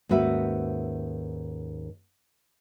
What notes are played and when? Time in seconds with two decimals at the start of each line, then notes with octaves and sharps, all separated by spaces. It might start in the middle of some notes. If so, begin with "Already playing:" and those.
0.09 D#2 G#2 C#4 F#4 B4 E5